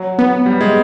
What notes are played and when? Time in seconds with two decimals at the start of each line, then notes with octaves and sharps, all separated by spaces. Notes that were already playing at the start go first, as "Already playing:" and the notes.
Already playing: F#3
0.19 B3
0.46 G3
0.61 G#3